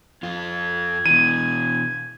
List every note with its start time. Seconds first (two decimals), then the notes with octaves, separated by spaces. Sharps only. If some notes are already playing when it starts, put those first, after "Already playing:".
0.23 F2 F4 G#6
1.06 B2 E3 D#7